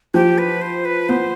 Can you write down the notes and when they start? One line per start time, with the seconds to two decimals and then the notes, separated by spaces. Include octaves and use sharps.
0.14 F3 G4
0.38 B4
0.62 C5
0.85 B4
1.09 B3 C5